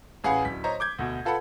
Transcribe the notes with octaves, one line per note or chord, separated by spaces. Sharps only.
A1 G#4 B4 F5 F#5
D1 B6
C5 C#5 D#5 A#5
D6 G6 G#6
D2 B2
F4 A4 B4 F#5 B5